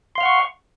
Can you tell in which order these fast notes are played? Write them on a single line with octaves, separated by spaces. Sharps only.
C6 F5 F6 F#5 C#6